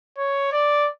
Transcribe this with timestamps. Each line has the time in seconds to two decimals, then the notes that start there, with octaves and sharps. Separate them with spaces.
0.18 C#5
0.52 D5